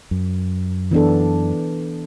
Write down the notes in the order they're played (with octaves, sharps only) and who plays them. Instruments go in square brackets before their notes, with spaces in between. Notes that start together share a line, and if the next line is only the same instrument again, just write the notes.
[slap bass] F#2
[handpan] E3 B3 D4 A4